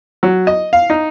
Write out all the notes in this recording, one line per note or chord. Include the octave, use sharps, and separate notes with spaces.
F#3
D#5
F5
D#4